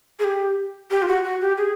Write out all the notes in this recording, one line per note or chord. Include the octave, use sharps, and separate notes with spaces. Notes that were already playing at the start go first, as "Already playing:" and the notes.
G#4
G4
G4
F4
F#4
F#4
G4
G#4